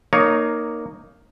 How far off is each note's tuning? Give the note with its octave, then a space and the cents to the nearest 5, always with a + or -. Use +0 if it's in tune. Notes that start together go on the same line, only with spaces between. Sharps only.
A#3 +0 D#4 -10 C#5 +15